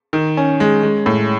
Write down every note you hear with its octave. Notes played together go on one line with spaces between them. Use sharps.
D#3
C#4
G#3
G#3
A2